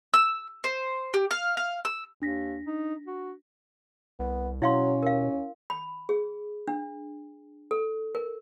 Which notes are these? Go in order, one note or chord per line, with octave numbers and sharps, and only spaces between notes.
E6
C5
G4
F5
F5
E6
D#2 D4 A#6 B6
D#4
F#4
C2 B3
B2 F#3 C#4 E4 F5 C6
D#2 A#4 F5
B5
G#4
D4
A4
A#4